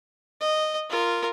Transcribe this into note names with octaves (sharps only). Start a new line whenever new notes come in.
D#5
F4 A#4